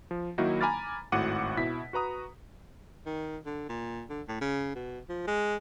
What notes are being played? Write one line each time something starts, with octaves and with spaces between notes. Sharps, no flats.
F3
D#3 F#3 A#3 D#4 E4 F#4
G#5 A#5 B5 D6 F6 A6
G#1 A2 F#4 F#5 D6 D#7
B2 E4 B6
F#4 B4 A#5 D#6
D#3
D3
A#2
D3
A2
C#3
B2
F3
G#3